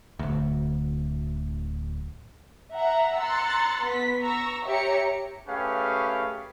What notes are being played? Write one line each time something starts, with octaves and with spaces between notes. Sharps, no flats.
D1 D2
E5 F#5 A#5
A#5 C6 E6 F#6 A6 C#7
B3 B6
A#5 C#6 E6 A#6
G4 C#5 E5 A#5 C#7
A3 C#4 G4 G#4 B4 F5